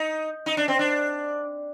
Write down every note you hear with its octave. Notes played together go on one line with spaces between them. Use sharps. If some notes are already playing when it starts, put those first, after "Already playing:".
Already playing: D#4
D#4
D4
C4
D4